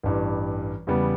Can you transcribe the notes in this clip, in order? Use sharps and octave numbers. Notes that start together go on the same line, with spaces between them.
A1 G2 E3 G3
E2 C#3 G3 B3